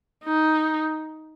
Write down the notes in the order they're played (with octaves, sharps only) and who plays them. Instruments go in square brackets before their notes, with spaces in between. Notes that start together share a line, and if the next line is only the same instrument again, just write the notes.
[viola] D#4